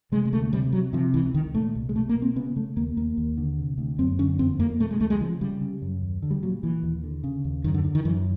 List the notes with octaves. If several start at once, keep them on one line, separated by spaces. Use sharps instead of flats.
C3 G#3
G#3
D2 A3
C3 G3
C3 F#3
C3 F3
C#2 E3
C#2 D#3
A#2 A3
C2
G#3
B2 A3
A#3
B2
C4
C#3 B3
C#3 A3
D#2 A#3
D#2 A#3
D#2
D3
C3
D2
F#2 C4
D3 C#4
F2 C4
F2 A#3
B2 A3
G#3
C#2 A3
G#3
C#3 F3
C#3 G3
C#3
F#2
D#2
D3
G3
A#2 F#3
A#2 E3
D#2
D3
C#3
D#2
F#2 D#3
D3
D3
D#3
F#2 E3